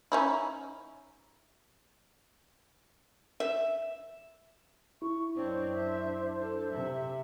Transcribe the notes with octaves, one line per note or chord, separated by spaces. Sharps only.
C#4 D#4 E4
E5
E4 C#6
F#2 C4 D4 C5 C#5
E5
D4 A4
C3 E5